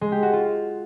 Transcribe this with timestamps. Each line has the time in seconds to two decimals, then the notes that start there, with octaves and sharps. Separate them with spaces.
0.01 G#3
0.12 G4
0.23 F#4
0.33 F4